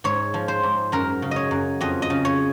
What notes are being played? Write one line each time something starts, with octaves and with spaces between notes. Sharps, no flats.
G#2 C#5
F3
C5
G#2
F#2 A#4
C#3
C#5 D#5
F#2
F2 D#5
D#5
C#3
C#5